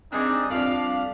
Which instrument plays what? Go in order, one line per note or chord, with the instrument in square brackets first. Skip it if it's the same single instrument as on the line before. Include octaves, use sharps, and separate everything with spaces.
[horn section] G3 D4 D#4 [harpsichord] C4 G#4 D5
[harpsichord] F2 G3 [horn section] D4 D5 F5